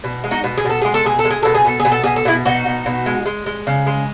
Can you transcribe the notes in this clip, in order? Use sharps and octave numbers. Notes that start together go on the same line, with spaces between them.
B2
G#3
D#4 F#4
B2
G#4
B2 A4
G#3 G#4
A4
B2 G#4
A4
G#3
G#4
B2 A4
G#4
B2 A4
G#4
B2
A4
B2 G#4
A4
B2 E4 G#4
B2 D#4 F#4
B2
B2
G#3
G#3
G#3
C#3
G#3